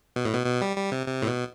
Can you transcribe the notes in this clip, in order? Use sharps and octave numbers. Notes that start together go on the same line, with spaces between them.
B2
A2
B2
B2
G3
G3
C3
C3
A2
B2